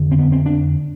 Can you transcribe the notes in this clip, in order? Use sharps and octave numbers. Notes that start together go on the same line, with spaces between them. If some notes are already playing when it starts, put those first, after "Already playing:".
Already playing: F2 D3
C4
B3
C4
D4